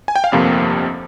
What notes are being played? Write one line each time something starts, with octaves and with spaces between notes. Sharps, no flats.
G#5
G5
F5
G1 F2 C3 F3 A#3